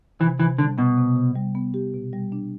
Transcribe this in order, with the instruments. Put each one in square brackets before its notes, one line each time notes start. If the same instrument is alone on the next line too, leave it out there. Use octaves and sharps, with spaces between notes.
[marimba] C3 [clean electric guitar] E3
[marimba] C3 [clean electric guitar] E3
[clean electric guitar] D3 [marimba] G3
[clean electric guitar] B2 [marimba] B3
[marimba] C3
C3
G3
B3
G4
B2
G3
D4